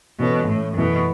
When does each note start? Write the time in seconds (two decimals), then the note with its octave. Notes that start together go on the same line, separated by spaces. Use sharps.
0.19 B2 E3 C#4 A4 C#5
0.48 A2
0.76 F#2 B2 E3 A3 E4